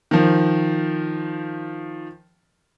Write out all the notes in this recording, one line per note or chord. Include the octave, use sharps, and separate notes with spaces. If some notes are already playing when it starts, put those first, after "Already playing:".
D#3 F3